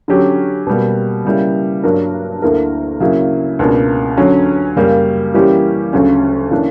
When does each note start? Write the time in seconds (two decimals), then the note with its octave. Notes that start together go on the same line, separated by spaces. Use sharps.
0.08 D3 F#3 C#4 G4
0.67 B2 G3 A#3
1.25 C#3 G3 A#3 E4
1.83 G2 F#3 A#3 D4 A#4
2.42 D2 D3 A#3 E4 A#4
3.00 C#3 F#3 A#3 E4
3.59 C#2 B2 A#3 D4
4.18 D3 F#3 C#4
4.76 F#2 C#3 G3 A#3
5.34 E3 G3 A#3 C#4 G4
5.93 D2 C#3 F#3 C#4
6.51 C#3 E3 A#3 D4